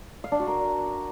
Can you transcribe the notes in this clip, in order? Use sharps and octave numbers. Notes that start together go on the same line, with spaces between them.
F5
D4
F#4
A#4